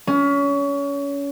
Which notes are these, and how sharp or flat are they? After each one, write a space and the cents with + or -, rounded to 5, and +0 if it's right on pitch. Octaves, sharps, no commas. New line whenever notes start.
C#4 +30